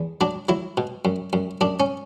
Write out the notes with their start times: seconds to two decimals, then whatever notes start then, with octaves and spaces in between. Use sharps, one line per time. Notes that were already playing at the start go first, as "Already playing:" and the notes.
Already playing: E2
0.21 F#3 D4
0.49 F#3 E4
0.77 B2
1.05 F#2
1.33 F#2
1.61 F#2 D4
1.80 C#4